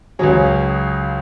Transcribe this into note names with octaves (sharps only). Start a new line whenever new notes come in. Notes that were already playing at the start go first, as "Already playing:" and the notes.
C#2 C#3 F#3 G#4 C#5